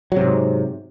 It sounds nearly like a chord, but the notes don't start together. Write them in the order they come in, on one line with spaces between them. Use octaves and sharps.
F#3 C3 G#2